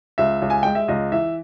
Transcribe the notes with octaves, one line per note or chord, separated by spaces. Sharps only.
C#2 E5
C#2
G#5
G#3 G5
E5
C#2 D#5
E3 E5